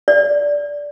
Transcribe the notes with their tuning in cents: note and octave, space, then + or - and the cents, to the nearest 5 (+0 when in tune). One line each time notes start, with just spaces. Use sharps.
D5 -10